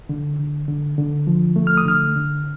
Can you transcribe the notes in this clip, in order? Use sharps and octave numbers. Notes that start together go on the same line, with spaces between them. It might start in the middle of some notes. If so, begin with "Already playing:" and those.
D3
D3
D3
D3
F3
A3
F6
D#6
D3 F6
D3